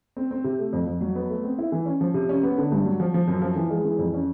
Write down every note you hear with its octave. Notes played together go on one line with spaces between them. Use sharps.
C4
C4
C3
A3
F2
F2
F#3
B3
A3
C4
E4
E3
C#4
F3
C3
C#4
B3
D3
G2
F#3
F3
F3
F#2
F3
E3
G#3
E3
F2
C#4